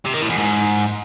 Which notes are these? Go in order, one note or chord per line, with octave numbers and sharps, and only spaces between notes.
C3
D#3
A2
E2
G#2